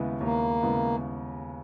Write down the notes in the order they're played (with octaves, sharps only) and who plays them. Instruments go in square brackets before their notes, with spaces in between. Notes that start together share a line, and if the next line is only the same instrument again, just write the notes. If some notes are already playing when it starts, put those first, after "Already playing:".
Already playing: [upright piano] D#2 C#3 G#3 B3 E4
[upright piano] D#2 [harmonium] A#3
[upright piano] C#3 G#3 B3 E4